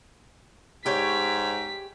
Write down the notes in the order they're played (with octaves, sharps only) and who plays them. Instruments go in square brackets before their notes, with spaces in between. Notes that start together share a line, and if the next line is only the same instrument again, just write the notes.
[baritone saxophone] G#2 [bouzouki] G4 C#5 [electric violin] B6